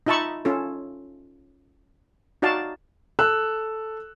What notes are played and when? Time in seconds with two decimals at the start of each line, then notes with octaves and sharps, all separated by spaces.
0.06 D#4 F4 E5 A5 B5 C#6
0.45 C#4 F4 A4
2.42 D#4 F#4 D5 F5 A5
3.19 A4 E6 F#6 E7